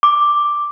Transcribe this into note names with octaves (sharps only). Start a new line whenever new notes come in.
D6